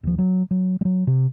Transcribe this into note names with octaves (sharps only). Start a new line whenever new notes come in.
D#1 F3
F#3
F#3
F#3 G3
C3